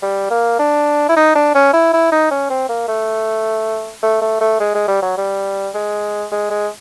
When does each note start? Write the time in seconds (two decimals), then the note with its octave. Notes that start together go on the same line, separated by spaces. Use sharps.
0.02 G3
0.31 A#3
0.59 D4
1.09 E4
1.17 D#4
1.35 D4
1.55 C#4
1.73 E4
1.93 E4
2.12 D#4
2.31 C#4
2.50 C4
2.69 A#3
2.88 A3
4.03 A3
4.22 A3
4.41 A3
4.60 G#3
4.74 G#3
4.88 G3
5.02 F#3
5.18 G3
5.74 G#3
6.32 G#3
6.51 G#3